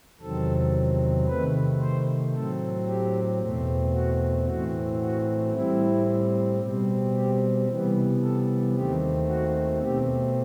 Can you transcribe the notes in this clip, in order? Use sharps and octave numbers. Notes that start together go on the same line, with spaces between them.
E2 C3 D#3 F#3 C4 A4
C3 D#3 A3 B4
C5
A2 F#3 C4 A4
G4
E2 B2 A3 C4
F#4
A2 E3 A3 C4 F#4
F#4
A2 G3 C4 E4
B2 G3 C4
G4
C3 E3 G3 B3
A4
D#2 D#3 A3 C4 G4
F#4
B2 A3 C4 G4